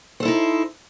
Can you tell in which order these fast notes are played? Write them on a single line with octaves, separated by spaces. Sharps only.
C5 A4 E4 D#4